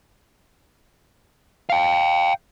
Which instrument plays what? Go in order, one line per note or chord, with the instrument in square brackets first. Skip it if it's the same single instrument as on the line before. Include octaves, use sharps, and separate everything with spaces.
[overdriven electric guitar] F5 G5